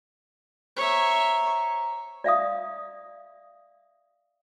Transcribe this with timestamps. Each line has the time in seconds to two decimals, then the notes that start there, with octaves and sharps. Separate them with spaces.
0.77 C5 C#5 E5 A#5
2.24 D5 E5 F5 D#6